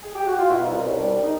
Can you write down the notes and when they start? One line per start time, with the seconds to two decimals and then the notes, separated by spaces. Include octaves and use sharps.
0.03 G#4
0.15 G4
0.27 F#4
0.39 F4
0.50 B2 E4
0.63 D#4
0.66 C2
0.83 C2 C#4
0.99 G3 D4
1.16 G3
1.24 D#4